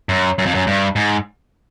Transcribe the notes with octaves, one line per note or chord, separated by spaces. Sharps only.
F#2
F#2
F2
F#2
G2
G#2